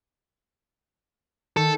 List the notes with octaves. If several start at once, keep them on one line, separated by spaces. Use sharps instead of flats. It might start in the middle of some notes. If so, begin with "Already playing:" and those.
D#3 A4